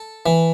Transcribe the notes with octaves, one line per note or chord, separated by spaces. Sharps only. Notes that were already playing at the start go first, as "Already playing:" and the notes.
Already playing: A4
E3